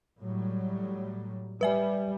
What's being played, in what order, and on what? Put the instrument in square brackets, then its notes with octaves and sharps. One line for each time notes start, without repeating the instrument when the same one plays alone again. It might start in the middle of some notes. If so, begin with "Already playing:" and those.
[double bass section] A2 F#3 G3
[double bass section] G3 [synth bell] B4 E5 G#5